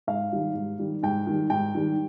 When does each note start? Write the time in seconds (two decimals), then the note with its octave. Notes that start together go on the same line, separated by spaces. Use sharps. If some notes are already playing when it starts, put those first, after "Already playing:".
0.07 G#2 F5
0.32 D#3 G3
0.55 G#2
0.79 D#3 G3
1.03 G#2 G5
1.27 D#3 G3
1.50 G#2 G5
1.75 D#3 G3